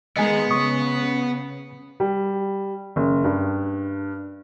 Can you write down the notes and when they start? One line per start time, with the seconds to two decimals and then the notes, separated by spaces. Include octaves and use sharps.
0.17 D#3 G#3 B3 G#4 D#5 G#5
0.51 C#3 C#6 D#6
2.00 G3
2.96 F#1
3.24 G2